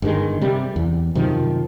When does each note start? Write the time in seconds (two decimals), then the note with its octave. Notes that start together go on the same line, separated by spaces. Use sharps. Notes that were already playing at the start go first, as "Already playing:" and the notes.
0.02 G1 G2 D#3 G#3
0.41 C3 G3
0.76 E2
1.15 F#2 C3 D#3 F3